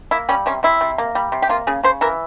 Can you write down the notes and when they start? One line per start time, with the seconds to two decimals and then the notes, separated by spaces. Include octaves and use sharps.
0.11 A#3 E4
0.29 G3 C#4
0.46 C3 C#4
0.63 C3 E4
0.81 C3
0.98 A#3
1.15 G3
1.32 C3
1.42 G4
1.49 A#3 F4
1.67 C#3 G#4
1.83 C#3 C5
2.01 E3 A#4